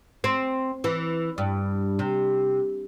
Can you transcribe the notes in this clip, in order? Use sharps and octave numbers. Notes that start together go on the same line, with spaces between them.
C4
E3
G2
C3